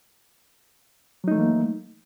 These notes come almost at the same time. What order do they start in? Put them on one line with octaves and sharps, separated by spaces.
F#3 D#4 A3 E3 A#3